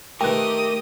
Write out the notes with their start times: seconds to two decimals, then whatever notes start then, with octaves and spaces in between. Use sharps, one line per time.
0.21 D#3 A3 G4 A#4 B4 G5 D#6